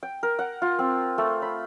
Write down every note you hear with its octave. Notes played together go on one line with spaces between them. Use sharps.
G5
A#4
F#5
F4
C4
A3
B5